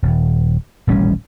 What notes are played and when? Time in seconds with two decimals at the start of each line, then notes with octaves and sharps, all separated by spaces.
0.03 D#1
0.87 D#1 A1 G3 C#4